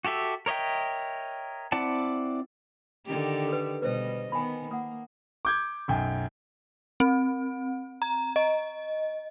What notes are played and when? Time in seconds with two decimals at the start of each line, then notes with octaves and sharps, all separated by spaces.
0.05 F#4 G4 A4 E5
0.46 A#4 C#5 D#5 E5 G5
1.72 C4 E4 D5 F#5 A5
3.06 D3 D#3 G4
3.48 A4 B4
3.82 B2 G3 B4 C5 D#5
4.32 D#3 B3 G#5 B5
4.71 A#3 F#5 D#6
5.45 D6 G6 G#6
5.88 B1 F#2 G5 G#5
7.00 C4
8.02 A#5
8.36 D#5